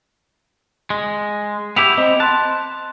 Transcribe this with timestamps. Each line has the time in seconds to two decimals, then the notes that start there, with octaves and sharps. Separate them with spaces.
0.90 G#3
1.76 B3 E4 G4 G5 E6 F7
1.98 C4 D#5 B5
2.20 A5 C6 F#6